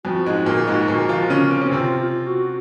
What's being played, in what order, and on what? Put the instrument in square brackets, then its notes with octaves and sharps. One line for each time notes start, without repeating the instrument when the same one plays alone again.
[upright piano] F2 F3 [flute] F#4
[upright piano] G#2 G#3
A#2 A#3
G#2 G#3
A#2 A#3
F3 F4
C#3 C#4
C4
C#4
[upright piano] C3 C4 [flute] F4
[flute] F4
F#4